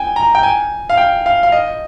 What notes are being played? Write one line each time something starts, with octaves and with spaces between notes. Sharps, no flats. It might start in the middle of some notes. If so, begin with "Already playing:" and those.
Already playing: G5 G#5
A#5
G5
G#5
F5
G5
F5
F5
D#5